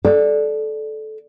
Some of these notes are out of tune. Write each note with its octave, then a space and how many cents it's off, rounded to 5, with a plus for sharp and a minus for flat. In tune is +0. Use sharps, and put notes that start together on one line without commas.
A4 -15 D5 +5